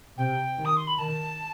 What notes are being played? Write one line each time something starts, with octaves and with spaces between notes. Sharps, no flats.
C3 G5
D#3
D#6
C6
B5
D#3 A5